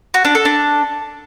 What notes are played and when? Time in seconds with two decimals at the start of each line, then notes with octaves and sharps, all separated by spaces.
0.14 F#4
0.25 D4
0.35 A4
0.45 D4